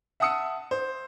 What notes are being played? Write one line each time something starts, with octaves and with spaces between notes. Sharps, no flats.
E5 F#5 A5 D#6 E6 C#7
C5